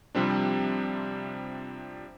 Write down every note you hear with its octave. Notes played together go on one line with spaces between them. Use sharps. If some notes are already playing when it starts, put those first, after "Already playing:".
C3 F3 G3 C4 D4